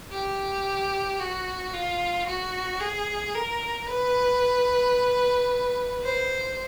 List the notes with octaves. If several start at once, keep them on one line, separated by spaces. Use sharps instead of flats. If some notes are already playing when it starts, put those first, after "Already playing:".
G4
F#4
F4
F#4
G#4
A#4
B4
C5